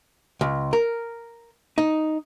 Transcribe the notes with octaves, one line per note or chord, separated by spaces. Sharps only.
C#2
A#4
D#4